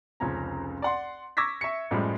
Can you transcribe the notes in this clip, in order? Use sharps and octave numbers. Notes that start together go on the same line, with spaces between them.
F1 C#2 F3 C#4 A#5
D5 F#5 C6
C#6 D6 E6 G#6 A#6 B6
E5 C#6 C#7
F#2 A2 F3 G3 G#3